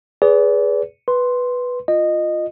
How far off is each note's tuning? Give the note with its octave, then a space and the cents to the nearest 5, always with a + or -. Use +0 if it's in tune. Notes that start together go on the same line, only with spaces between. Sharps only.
G#4 +0 B4 +5 D5 -35
B4 +0 C6 +0
F4 +0 D#5 -15